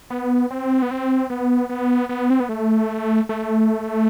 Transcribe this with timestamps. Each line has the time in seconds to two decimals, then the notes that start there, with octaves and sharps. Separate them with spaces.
0.10 B3
0.51 C4
0.82 B3
0.91 C4
1.30 B3
1.69 B3
2.09 B3
2.30 C4
2.40 B3
2.49 A3
3.29 A3